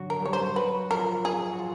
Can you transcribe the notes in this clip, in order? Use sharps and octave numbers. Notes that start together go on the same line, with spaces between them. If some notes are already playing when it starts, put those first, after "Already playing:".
Already playing: D3 F#3 D4 F#4
A#4
G3 G4 C#5
C5
F#3 F#4 B4
F3 F4 A#4
G#4
F#4
F3 F4